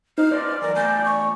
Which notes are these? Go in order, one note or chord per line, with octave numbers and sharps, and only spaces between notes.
D#4 C5 F6
D#4 B4 C5 D5
E3 F#3 A#4
E2 A3 G#5 G6
C#6